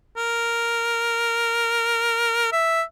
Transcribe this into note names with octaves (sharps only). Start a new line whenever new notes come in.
A#4
E5